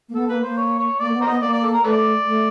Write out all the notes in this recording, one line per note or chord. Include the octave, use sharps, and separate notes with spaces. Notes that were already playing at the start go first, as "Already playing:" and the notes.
A#3
B3 A4
A#3 B4
A#3 C5
C#5
C#5
A#3 D5
B3
A#4 C5 D#5
B3
A#3 D5
D5
A4
A#4
A3 A4 B4 D5
A3